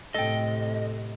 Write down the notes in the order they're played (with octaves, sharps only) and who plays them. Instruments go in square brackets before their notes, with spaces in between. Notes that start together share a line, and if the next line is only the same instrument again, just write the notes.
[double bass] A2 C3 [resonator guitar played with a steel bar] A4 G5 [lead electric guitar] D#5